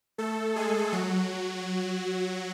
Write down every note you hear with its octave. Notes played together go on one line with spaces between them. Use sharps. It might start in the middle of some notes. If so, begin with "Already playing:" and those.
A3 A4
G#3 G#4
F#3 F#4